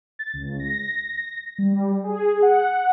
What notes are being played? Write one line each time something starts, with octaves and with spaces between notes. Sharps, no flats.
A6
C#2
A#6
G3
G#4
F#5